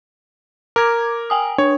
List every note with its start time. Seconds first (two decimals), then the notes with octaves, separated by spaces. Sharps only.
0.76 A#4 D6 G#6
1.30 G5 G#5 D#6
1.58 D4 C#5